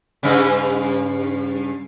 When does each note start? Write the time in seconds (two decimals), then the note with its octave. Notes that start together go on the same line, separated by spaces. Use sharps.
0.23 G2 C#3